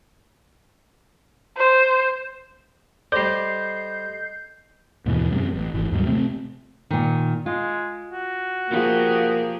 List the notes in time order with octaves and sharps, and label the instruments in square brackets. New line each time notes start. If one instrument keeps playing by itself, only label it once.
[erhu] C5
[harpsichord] G3 C5 [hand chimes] A4 D#5 A#6 [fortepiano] D5 [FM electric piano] G6 C7
[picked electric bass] D#2 G#2 B2 E3
F#2 C3
A1
G#1 E3
D#2 G#2 F#3 G3
C3 A3 C4
[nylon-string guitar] A#2 D#3
[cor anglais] G#3 [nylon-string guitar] F4
[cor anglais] F#4
[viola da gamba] F3 G4 G#4 [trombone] A#3